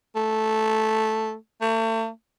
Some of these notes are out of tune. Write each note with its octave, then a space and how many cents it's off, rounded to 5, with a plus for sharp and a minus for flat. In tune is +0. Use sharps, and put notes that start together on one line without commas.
A3 -5
A3 +35